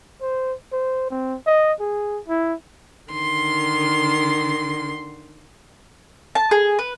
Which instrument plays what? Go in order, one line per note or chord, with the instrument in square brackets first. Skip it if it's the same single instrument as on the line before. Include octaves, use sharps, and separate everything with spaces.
[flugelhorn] C5
C5
C4
D#5
G#4
E4
[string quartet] D3 D#3 C6
[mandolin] A5
G#4
B4